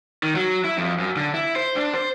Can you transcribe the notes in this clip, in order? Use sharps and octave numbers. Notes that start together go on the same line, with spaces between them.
D#3
F#3
E4
F2
F#2
D3
E4
C5
D4
C5